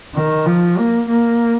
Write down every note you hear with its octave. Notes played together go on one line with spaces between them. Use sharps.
D#3
F3
A#3
A#3